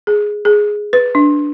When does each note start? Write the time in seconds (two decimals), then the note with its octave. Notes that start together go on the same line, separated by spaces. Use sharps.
0.07 G#4
0.45 G#4
0.93 B4
1.15 D4